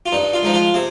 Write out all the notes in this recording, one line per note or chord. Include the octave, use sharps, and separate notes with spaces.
F4
G2 D#4
F4
F3 G#3 D#4
F4
C3 G#4